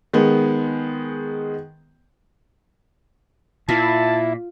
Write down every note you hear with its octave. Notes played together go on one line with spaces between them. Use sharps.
D#3 G#3 B3
A#2 E4 F4 A5